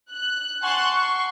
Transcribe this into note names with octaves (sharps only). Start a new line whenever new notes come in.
F#6
F#5 G#5 A5 C6 C#6 F#6
C6 C#6